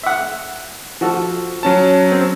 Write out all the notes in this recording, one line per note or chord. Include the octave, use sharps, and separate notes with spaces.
E5 F#5
F3 F#4 A4
F#3 C#4 A5
C4